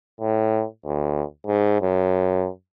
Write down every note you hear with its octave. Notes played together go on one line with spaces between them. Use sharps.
A2
D2
G#2
F#2